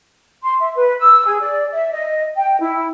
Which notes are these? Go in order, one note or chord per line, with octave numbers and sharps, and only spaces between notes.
C6
E5
B4
E6
G#4
D5
E5
D#5
G5
E4